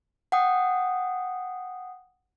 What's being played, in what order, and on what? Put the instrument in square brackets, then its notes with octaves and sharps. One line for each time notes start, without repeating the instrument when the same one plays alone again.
[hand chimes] F#5 G5 D#6